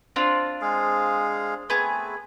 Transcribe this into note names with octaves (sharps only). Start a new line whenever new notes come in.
C4 D4 F4
G#3 G#4 F5
A3 B3 C4 G#4 B4